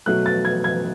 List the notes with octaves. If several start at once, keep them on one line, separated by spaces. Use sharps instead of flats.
B2 F#3 A3 F#6
A6
G#6
G#6